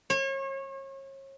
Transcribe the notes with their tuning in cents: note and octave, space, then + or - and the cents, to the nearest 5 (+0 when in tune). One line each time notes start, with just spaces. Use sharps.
C#5 -35